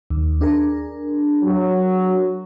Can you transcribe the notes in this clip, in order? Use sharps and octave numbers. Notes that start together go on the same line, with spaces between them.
D#2
D4 G#4 A#4
F#3